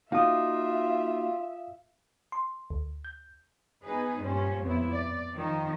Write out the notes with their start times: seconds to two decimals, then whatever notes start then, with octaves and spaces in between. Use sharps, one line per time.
0.12 A#3 D#4 F4 F#4 E5 F5 D#6
2.32 C6
2.70 D2
3.05 G6
3.84 B3 D#4 G#4 B4
4.22 G2 A#2 G3 C#4 C5 C#5
4.63 F2 B3 E4
4.92 D5
5.34 D#3 F3 D#4